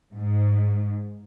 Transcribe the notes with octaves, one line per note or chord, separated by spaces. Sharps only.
G#2